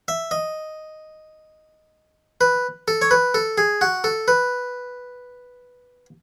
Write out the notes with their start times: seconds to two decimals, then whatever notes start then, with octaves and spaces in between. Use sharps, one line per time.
0.08 E5
0.31 D#5
2.41 B4
2.88 A4
3.02 C#5
3.11 B4
3.34 A4
3.58 G#4
3.81 F#4
4.04 A4
4.28 B4